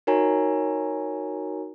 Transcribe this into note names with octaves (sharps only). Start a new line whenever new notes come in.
D#4 F#4 A#4 C#5 G#5 A#5